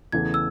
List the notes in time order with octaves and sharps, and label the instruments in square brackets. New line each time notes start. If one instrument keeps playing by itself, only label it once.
[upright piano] E2 C#3 E3 A3 [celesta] G#6
[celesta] E6